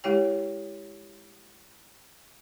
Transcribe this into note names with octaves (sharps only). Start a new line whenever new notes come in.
G#3 E4 G4 C#5 G5